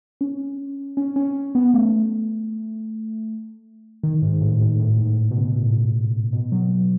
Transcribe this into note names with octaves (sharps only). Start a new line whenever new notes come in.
C#4
C#4
C#4
B3
A3
D#3
G#2
G#2
A2
G#2
A2
G#2
A2
B2
C#3
B2
A2
B2
F#3